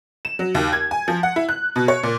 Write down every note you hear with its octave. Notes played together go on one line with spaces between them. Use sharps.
E7
F#3
D#2
G#6
G#5
F3
F#5
E4
F#6
B2
C#5
A#2